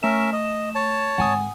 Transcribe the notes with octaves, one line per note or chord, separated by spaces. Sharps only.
A3 C#4 A#4 E5 E7
D#5
C#5 A5
G#1 D3 F#5 G#5 D#6